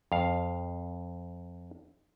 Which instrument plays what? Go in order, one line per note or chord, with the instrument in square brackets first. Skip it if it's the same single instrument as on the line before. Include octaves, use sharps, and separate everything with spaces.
[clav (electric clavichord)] F2 F5